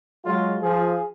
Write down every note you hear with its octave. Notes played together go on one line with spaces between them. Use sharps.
F#3 G#3 F4
F3 G#4